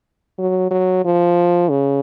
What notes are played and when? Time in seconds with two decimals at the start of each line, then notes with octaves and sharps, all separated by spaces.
0.38 F#3
0.71 F#3
1.05 F3
1.70 C#3